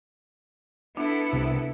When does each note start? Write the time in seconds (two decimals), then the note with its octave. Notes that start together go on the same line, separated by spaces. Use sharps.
0.97 B3 D4 E4 A4
1.33 C2 C3